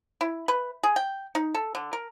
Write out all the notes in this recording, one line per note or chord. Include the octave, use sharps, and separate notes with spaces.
E4
B4
G#4
G5
D#4
A4
D3
A#4